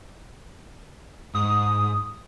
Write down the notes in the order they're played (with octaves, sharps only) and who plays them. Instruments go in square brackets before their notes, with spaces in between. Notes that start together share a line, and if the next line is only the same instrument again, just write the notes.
[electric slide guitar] G#2 [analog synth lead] D#6